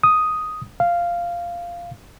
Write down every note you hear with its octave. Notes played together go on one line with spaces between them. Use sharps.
D#6
F5